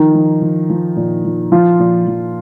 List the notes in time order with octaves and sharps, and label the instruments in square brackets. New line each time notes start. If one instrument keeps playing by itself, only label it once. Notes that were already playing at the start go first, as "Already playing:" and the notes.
Already playing: [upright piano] D#3 F3 D#4
F3
F3
F3
A#2
F3
F3 F4
A#2
F3